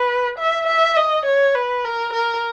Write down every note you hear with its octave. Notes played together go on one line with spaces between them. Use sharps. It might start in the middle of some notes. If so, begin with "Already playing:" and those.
Already playing: B4
E5
E5
D#5
C#5
B4
A#4
A#4